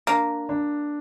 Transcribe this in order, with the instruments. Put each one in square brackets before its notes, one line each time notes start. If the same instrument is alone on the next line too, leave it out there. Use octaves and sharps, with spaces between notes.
[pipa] A#3 [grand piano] D4
[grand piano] D4